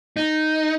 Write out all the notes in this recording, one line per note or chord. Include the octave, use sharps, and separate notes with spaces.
D#4